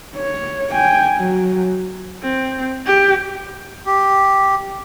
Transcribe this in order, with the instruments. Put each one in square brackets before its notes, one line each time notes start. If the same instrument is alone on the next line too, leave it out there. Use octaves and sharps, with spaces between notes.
[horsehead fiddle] C#5
G5 G#5
F#3
C4
G4
[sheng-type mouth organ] G4